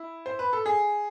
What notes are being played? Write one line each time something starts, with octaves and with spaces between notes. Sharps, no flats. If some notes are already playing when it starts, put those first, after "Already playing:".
Already playing: E4
C5
B4
A4
G#4